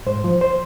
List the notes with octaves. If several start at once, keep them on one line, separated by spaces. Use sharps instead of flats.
G#2 C5
F3
C5